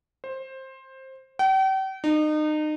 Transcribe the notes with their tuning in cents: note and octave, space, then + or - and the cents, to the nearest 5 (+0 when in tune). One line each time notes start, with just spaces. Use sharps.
C5 +15
G5 -40
D#4 -30